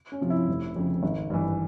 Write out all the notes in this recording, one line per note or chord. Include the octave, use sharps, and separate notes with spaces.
C#4
C3 F3
E4
F1
F2 C#3
G#1
G2 E3